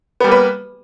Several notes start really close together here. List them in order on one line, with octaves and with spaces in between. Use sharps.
B3 G3 A#3 B4